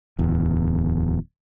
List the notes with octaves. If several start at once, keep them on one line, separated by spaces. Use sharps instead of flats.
D1 E2